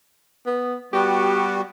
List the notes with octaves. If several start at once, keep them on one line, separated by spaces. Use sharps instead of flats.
B3
G3 B3 F#4 G4